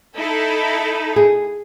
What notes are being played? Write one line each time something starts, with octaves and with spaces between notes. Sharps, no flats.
D#4 E4 A4
G#4